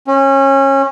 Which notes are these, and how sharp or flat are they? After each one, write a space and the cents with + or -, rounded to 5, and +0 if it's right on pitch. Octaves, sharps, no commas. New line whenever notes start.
C#4 -25